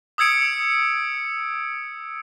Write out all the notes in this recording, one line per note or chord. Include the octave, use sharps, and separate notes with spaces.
D#6 E6 G#6 C#7 D7